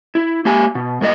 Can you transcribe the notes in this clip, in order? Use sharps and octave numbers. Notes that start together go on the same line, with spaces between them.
E4
A#3 G4 G#5
B2
G2 A#3 F#4 D#5